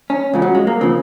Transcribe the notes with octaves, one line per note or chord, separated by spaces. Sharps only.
C#4
C#2 C#3 F3
F#3
G#3
A#3
C#3 F3 C4